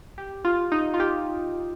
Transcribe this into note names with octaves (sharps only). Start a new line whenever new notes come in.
G4
F4
D#4
F4
G4